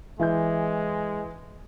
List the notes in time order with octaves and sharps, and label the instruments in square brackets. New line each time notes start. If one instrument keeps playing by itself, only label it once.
[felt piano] E3 E4 G6 [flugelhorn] G#3